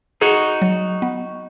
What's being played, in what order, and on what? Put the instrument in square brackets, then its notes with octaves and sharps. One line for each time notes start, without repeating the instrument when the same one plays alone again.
[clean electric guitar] D#4 F#4 [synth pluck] G#4
[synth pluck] F#3
B3